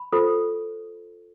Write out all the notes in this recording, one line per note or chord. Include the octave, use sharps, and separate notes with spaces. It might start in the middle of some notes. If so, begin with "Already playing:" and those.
Already playing: B5
F4 A4 C5